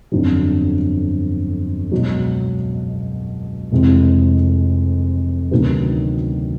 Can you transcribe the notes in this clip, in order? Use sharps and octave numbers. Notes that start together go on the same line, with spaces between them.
G1 F2 D3 F#3
C#2 B2 F#3
F1 F2 C3 E3 G#3
D2 C3 D#3 F#3 B3